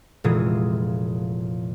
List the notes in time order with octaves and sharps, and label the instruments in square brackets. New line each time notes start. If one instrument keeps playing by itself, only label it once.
[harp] F1 A#2 E3 G#3 D#6